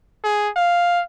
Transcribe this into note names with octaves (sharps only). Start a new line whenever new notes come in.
G#4
F5